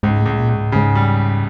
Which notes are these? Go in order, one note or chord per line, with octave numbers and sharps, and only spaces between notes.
C#2 G#2
A2
C#2
A#2
C#2
G#2
A2
G#2 C#3
G3